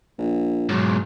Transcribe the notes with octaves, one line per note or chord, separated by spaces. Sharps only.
A#1
B1 G#2 F#3